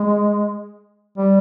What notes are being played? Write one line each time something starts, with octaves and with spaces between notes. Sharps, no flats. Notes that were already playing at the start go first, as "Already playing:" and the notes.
Already playing: G#3
G3